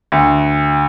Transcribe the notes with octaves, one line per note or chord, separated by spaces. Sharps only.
D2